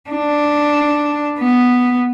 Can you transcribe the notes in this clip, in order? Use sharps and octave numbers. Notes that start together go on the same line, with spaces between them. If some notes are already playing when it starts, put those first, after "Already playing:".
D4
B3